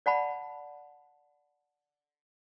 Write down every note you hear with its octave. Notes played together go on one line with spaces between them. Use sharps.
D5 F#5 A5 B5